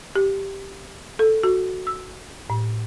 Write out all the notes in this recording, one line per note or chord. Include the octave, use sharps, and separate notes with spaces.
G4
A4
F#4
E6
A2